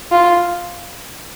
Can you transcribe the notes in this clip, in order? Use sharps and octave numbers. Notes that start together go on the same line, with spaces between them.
F4